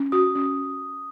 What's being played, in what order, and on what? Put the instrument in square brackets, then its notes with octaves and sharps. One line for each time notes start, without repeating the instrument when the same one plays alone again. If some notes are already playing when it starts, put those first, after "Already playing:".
Already playing: [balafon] C#4
[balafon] F#4 [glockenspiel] D#6
[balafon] C#4